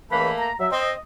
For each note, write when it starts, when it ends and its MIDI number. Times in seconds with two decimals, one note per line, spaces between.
0.11 0.30 37
0.11 0.30 52
0.11 0.49 57
0.11 0.49 58
0.11 0.30 83
0.39 0.53 82
0.59 0.67 54
0.59 0.67 76
0.71 0.91 60
0.71 0.95 75